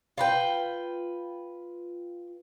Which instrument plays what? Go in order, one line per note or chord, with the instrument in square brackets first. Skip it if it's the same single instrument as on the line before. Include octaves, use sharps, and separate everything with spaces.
[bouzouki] F4 B4 G5